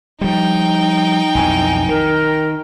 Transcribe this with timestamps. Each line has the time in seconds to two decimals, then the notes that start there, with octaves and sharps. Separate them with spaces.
0.21 F3 G3 D#4 G5
1.35 B1 F2 E3 G#5
1.89 D#3 A#4